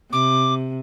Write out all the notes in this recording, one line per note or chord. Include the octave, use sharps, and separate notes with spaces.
C3 D6